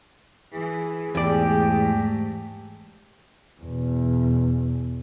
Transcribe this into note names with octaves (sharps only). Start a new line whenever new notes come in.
E3 G#4
E2 G#2 A3 G4 D5
E2 B2